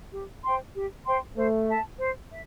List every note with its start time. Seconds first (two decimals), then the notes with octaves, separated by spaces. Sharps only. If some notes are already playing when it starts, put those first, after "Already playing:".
0.13 G4
0.44 C5 G5 C6
0.74 G4
1.06 C5 G5 C6
1.37 A3 C5
1.68 E5 A5
1.99 C5
2.31 E5